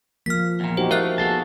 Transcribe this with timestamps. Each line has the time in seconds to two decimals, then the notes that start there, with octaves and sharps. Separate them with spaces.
0.26 F3 A#3 F6 B6
0.60 E2 A#2
0.77 D#4 F#4 G4 C5
0.91 A3 A#4 E5 F5 F#6
1.18 B3 F#4 G#4 A4 F5 A5